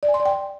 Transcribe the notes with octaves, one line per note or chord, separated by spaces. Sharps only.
D5
G#5
C6
D5
G5